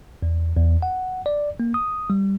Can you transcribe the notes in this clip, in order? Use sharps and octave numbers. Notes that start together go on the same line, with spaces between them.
E2
E2
F#5
D5
A#3
D#6
G3